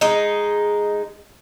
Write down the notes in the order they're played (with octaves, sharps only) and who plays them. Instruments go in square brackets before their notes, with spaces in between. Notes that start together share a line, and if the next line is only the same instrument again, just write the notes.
[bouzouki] G#3 D#4